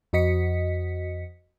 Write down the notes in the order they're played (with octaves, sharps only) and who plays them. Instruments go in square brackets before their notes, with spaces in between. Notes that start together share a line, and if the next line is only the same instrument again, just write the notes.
[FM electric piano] F2 F#4 D#5 B6 C#7